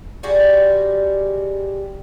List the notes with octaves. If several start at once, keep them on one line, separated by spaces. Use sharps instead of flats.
G3 G#3 F#4 G4